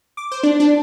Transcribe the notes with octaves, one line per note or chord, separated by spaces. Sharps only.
D6
C5
D4
D4